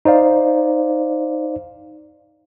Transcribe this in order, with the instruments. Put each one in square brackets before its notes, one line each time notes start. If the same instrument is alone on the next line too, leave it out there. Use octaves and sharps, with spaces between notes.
[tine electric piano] D#4 C5 D5 F5